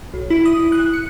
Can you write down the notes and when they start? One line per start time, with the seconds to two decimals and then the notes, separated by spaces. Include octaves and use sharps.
0.13 B1
0.30 E4
0.45 D#6
0.72 F#6
0.93 C#7